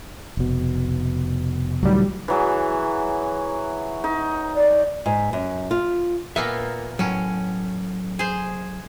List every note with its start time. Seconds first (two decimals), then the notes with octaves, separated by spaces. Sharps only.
0.37 F1 B2
1.83 C#2 A2 D#3 F#3 G3
2.28 E3 F#3 G#4
4.04 D#4
4.56 D5
5.06 G#2
5.33 F#2
5.71 F4
6.36 A#2 A#3 B3 E5
6.99 A2 F#3 C#4
8.19 G#4 C5